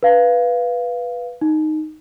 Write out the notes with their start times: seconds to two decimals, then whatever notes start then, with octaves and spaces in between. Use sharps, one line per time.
0.03 B4 F5
1.41 D#4